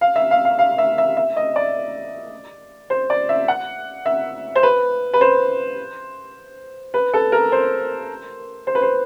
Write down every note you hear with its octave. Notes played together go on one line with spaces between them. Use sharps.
F5
E5
F5
F5
F5
E5
E5
E5
D#5
D5
C5
D5
E5
F#5
E5
C5
B4
B4
C5
B4
A4
A#4
C5
C5
B4
C5